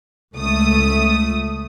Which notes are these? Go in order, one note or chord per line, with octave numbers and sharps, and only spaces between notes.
C#2 A3 D#6